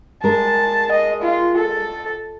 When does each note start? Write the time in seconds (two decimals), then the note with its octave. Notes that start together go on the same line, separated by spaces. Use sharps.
0.24 G#3 A#4 A5
0.92 D#5
1.23 F4
1.58 A4